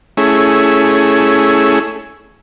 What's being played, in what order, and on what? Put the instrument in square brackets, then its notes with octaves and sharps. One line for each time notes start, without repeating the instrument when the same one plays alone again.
[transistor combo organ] A3 C#4 E4 G#4